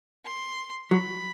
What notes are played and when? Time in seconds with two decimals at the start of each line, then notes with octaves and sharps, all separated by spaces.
0.25 C6
0.91 F#3 B5